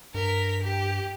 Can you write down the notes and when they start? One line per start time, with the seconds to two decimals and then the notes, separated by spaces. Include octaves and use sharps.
0.15 G2 A#4 B6
0.63 G4